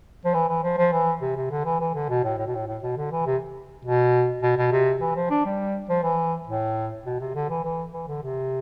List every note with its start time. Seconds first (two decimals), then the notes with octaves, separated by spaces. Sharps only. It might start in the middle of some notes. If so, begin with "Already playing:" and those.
0.25 F3
0.34 E3
0.49 E3
0.63 F3
0.77 F3
0.92 E3
1.21 C3
1.36 C3
1.51 D3
1.65 E3
1.80 E3
1.95 D3
2.09 B2
2.24 A2
2.39 A2
2.47 B2
2.55 A2
2.67 A2
2.83 B2
2.97 D3
3.11 E3
3.26 C3
3.85 B2
4.43 B2
4.57 B2
4.72 C3
5.01 E3
5.16 F3
5.30 D4
5.45 G3
5.89 F3
6.03 E3
6.47 A2
7.06 B2
7.20 C3
7.35 D3
7.50 E3
7.64 E3
7.93 E3
8.08 D3
8.23 C3